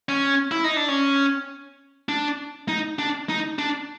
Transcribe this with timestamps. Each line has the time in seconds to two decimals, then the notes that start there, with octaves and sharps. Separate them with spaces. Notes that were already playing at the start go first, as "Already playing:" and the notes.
0.09 C#4
0.51 E4
0.64 D#4
0.76 D4
0.88 C#4
2.09 D4
2.69 D#4
2.99 D4
3.29 D#4
3.59 D4